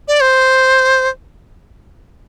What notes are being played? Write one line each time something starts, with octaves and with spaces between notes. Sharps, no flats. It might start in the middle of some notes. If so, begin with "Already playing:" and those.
D5
C5